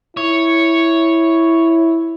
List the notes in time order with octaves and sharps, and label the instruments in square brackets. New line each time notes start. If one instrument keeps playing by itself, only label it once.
[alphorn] E4 [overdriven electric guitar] C#5